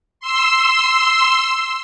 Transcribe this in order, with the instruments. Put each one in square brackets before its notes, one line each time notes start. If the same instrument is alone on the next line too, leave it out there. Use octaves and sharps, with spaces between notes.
[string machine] C6 E6